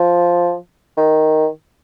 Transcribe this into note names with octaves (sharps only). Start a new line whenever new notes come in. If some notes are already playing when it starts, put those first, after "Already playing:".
Already playing: F3
D#3